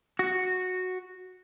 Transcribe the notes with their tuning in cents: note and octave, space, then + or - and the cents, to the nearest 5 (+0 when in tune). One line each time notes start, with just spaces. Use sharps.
F#4 -5